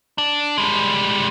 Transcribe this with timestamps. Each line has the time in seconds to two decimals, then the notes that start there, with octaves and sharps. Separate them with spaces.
0.18 D4
0.58 G3 G#3